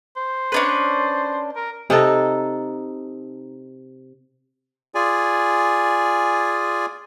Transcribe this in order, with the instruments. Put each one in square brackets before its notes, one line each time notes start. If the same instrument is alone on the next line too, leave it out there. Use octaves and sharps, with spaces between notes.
[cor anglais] C5
[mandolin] C#4 D4 B4
[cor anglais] A#4
[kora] C3 D#4 A4
[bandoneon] F4 G#4 D5 G#5